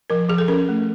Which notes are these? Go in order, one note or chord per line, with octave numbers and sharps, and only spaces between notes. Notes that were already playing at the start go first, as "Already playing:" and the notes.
F3 A#4
F3 G#4
A4
C#4 A#4
A3